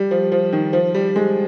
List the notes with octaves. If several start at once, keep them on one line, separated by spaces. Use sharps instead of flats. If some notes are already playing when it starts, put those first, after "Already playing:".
Already playing: G3
F3
F3
D#3
F3
G3
G#3